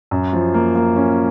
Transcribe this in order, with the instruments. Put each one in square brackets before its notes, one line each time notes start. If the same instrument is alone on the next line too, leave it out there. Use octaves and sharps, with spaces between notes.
[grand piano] F#2
F3
A#3
A#3
C#4